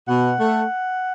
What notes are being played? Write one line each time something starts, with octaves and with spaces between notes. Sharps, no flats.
B2 F#5
A3